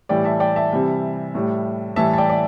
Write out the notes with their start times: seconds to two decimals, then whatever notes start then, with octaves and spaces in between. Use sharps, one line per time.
0.09 A2 E3 G3 D5 G5
0.25 E5 A5
0.40 D5 G5
0.56 E5 A5
0.72 C3 E3 G3
1.35 A2 G3
1.96 A2 E3 G3 E5 A5
2.13 A5
2.18 D5 G5
2.30 D5